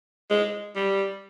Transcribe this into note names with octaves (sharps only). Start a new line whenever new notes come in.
G#3
G3